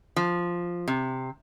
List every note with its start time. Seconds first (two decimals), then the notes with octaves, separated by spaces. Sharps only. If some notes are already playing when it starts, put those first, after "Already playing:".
0.16 F3
0.88 C3